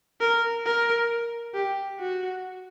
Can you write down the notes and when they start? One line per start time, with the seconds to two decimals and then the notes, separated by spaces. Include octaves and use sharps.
0.21 A#4
0.66 A#4
1.54 G4
1.99 F#4